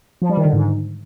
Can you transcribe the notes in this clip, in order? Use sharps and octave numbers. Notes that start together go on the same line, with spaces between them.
F3
G3
D#3
D3
G#2